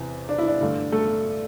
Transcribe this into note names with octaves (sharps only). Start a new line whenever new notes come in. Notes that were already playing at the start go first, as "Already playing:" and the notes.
Already playing: E2 C3 E3
D4
E4
D4
G2 D3 A3
A3 A4